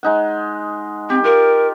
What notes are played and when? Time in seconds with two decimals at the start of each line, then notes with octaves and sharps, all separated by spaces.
0.03 G#3 D#4 F#5
1.10 C4 G4
1.24 F4 A#4